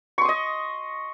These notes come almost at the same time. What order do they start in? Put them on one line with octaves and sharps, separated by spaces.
C#6 C6 D#6 D#5